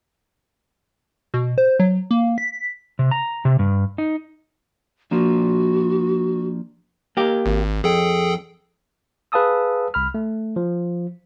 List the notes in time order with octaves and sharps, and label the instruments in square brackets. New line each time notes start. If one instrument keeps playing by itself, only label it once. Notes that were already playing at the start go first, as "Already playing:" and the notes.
[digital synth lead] B2
C5
F#3
A#3
B6
[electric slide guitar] C3
A#5
C3
G2
D#4
[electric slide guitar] F3 A#3 D4 [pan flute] F#4
[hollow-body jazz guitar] A#3 G4
[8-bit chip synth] G#1
[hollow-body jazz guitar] F2 [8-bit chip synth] G#4 A4 G5
[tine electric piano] G#4 B4 F5 A5 D#6 E6
C2 B5 F6
A3
F3